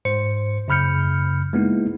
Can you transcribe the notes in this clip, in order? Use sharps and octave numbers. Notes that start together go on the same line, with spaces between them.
G#2 C5 C#7
F#2 C#3 B5 F6 G6 C#7
G#3 A#3 B3 D#4 E4